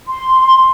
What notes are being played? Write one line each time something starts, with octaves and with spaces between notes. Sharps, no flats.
C6